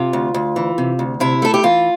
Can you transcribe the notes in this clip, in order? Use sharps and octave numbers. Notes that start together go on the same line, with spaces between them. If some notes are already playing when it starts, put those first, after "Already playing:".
Already playing: C3 F4
D2
D2
E3
C3
D2
C3 E4
A3 A4
G4
E3 F4